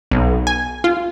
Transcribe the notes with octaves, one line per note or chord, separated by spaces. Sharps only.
B1
G#5
F4